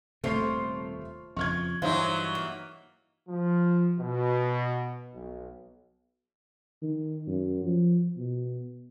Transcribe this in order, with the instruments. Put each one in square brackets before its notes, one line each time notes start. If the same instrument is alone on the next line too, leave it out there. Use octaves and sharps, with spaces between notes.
[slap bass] D#1 C3 [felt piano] A3 C7 [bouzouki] F4 C5 C#5
[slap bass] F2 C#3 F3 [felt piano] C#6 F6 G#6
[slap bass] G2 [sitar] E3 F#3 D#4 [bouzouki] C5 [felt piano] F5
[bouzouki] A#3
[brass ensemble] F3
B2
B1
[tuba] D#3
F#2
F3
B2